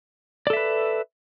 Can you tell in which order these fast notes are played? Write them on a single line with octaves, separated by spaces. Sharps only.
D5 A4 E5 B4